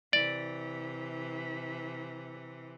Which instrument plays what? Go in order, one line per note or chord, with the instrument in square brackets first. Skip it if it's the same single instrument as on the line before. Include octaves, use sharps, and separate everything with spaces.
[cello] C3 E3 [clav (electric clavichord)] D5